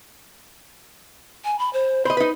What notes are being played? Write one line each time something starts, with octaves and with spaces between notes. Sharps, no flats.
G#5
B5
C5
C5 D#5 B5
D#4 B4